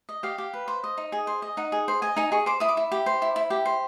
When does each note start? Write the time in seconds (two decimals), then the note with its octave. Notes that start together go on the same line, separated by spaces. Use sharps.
0.09 D#5
0.23 G4 F5
0.38 G4
0.54 B4
0.68 C5
0.84 D#5
0.97 D#4
1.12 G#4
1.27 C5
1.42 D#5
1.57 D#4 F#5
1.72 G#4
1.88 C5
2.02 D#5 G#5
2.16 D#4 G#5
2.32 G#4 C#6
2.46 C5 D6
2.60 E4 D#6
2.69 D6
2.77 E4
2.92 G4
3.06 C5
3.22 E4
3.36 E4
3.50 G4
3.66 C5